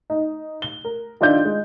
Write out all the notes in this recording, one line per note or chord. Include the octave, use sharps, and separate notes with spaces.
D#4
G7
A#4
D#3 D4 F4 D5 E5 G6
G#3